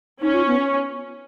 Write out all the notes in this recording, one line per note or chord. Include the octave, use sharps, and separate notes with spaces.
C#4 D#4
F4
B3